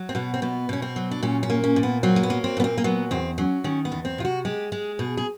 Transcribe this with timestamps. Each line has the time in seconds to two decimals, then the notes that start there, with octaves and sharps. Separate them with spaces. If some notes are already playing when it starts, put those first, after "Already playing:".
Already playing: F#3
0.09 C4
0.15 B2 B3
0.34 C4
0.42 B2 B3
0.69 B2 C#4
0.82 C4
0.96 F#3
1.11 D4
1.23 A#2 C#4
1.43 C#4
1.50 A#3
1.64 C#4
1.76 A#2
1.83 B3
2.03 F#3 C4
2.16 A#3
2.23 B3
2.30 A#3
2.44 C4
2.57 A#2 B3
2.64 C4
2.78 A#3
2.84 F#3 B3
3.11 E2 C4
3.38 F#3 C#4
3.64 D#3 C#4
3.85 B3
3.92 E2
4.05 C4
4.18 C3 F4
4.25 F#4
4.45 G#3 G4
4.72 G#3 G#4
4.99 B2 G#4
5.17 G#4